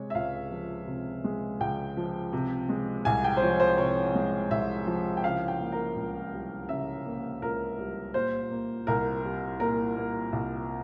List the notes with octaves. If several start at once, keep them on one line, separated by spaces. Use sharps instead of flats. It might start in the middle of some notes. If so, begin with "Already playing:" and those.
Already playing: C3 G#3 C#5
E5
C#2 F5
F3
C3
G#3
C#2 G5
F3
C3
G#3
C2 G#5
G5
C5
F3 C#5
C5
C3 C#5
G#3
C2 E5
F3
G5
C#3 F5
G5
A#3
A#4
C#2
G3
C#3 E5
A#3
C#2 A#4
G3
A#2 C5
A#3
C2 A#4
G3
A#2 A#4
A#3
C2